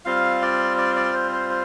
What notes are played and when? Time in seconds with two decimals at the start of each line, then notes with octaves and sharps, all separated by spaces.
0.05 G3 C4 F4 F5
0.42 D5
0.78 D5
0.96 D5
1.13 C5
1.32 C5
1.49 C5